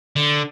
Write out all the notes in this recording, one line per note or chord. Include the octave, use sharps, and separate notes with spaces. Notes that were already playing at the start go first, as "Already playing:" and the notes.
D3